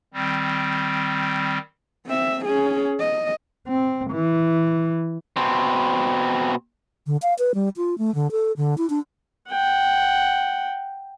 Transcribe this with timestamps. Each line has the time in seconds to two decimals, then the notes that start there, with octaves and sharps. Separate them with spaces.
0.14 D#3 G3 C4
2.06 C4 E5
2.45 C#4 G#4
2.99 D#5
3.68 C4
4.11 E3
5.37 B2 C4
7.07 D3
7.22 F5
7.39 B4
7.54 G3
7.77 F4
7.98 A3
8.15 D3
8.31 A4
8.57 D3
8.78 E4
8.90 D4
9.50 F#5 G5